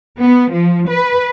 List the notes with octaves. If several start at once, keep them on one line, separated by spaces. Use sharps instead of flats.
B3
F3
B4